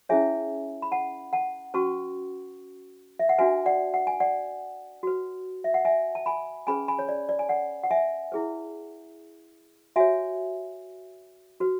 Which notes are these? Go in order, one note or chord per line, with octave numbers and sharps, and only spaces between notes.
C#4 E4 G#4 C#5 E5 G#5
B5
F#5 A5
F#5 A5
C#4 F#4 B4 A5 C#6
E5
F#5
D4 F#4 B4 E5 G#5
D5 F#5
F#5
G#5
D5 F#5
F#4 B4
E5
F#5
E5 G#5
A5
G#5 B5
C#4 G#4 B4 G#5 B5
G#5 B5
C#5
D5
D5
G#5
D5 F#5
F#5
E5 G#5
E4 G#4 B4
F#4 C#5 E5 G#5
F#4 B4